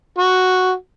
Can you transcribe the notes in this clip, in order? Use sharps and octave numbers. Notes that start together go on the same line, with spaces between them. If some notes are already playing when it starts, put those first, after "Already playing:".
F#4